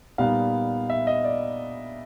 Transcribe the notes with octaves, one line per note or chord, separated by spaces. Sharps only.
A#2 G3 B3 D#4 F5
E5
D#5
D5